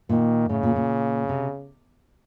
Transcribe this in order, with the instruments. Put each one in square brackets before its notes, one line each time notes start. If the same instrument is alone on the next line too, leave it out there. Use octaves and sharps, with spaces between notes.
[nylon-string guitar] A#2 [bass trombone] D#3
[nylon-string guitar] A2 [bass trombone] C#3
[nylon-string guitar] A#2
A#2
C3